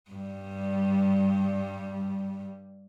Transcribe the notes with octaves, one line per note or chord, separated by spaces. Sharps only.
G2 G3